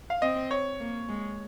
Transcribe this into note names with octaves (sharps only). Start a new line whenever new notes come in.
F5
C4 D#5
C#5
A#3
G#3